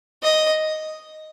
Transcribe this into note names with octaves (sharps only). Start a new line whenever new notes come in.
D#5